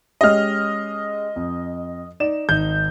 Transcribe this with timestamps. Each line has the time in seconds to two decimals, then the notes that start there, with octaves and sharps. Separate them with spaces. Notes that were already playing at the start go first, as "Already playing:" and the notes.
0.21 G#3 C#4 G4 D#5 F6
1.36 F2
2.20 D#4 D5 E7
2.49 G#1 D#4 G6